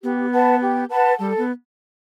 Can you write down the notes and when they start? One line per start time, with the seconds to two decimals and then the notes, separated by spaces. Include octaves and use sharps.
0.03 B3 G4
0.32 B4 F#5 A5
0.61 G4
0.90 B4 F#5 A5
1.19 G3 A4
1.38 B3